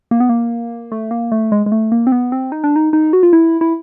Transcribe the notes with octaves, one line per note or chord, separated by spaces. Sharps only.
A#3
B3
A#3
A3
A#3
A3
G#3
G#3
A3
A#3
C4
B3
C4
D#4
D4
D#4
D#4
F#4
F4
E4
E4